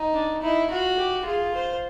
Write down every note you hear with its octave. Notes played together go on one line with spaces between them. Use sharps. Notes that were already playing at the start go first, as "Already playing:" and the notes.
Already playing: D#4
D4
D#4 E4
F4 F#4
G4
F4 G#4
C5